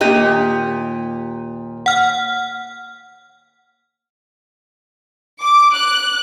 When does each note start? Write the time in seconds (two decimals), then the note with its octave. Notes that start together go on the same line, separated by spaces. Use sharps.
0.01 A#2 A#3 D#4 G4 D5 D#5
0.14 D#2
1.86 F#5 F6
5.42 D6
5.74 F#6